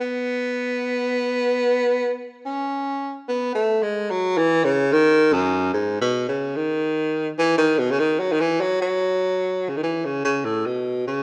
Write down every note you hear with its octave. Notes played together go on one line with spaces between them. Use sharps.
B3
C#4
B3
A3
G#3
F#3
E3
C#3
D#3
F#2
G#2
B2
C#3
D#3
E3
D#3
B2
C#3
D#3
F#3
D#3
E3
F#3
F#3
C#3
D#3
E3
C#3
C#3
A2
B2
C#3